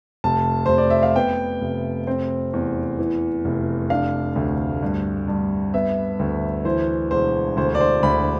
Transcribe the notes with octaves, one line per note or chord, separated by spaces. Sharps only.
F1 A5
F1 C5
D5
E5
F5
B3 G5
F1
C4
E2
E3
F1
D4 F5
D2
G2
G2
B3 E5
D2
E3 C5
E1 C5
D2 C5
D5
C5
D2 B5